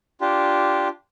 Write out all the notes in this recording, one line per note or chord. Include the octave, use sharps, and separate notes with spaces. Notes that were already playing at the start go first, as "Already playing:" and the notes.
D4 F4 G4